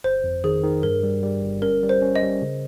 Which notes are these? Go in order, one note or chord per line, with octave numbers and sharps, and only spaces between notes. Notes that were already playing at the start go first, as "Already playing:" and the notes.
G1 C5
F2
D#3 G#4
D#3
G2 A#4
G3
G3
G1
C#4 A#4
G3
C5
C#4
D#5
G3
C#3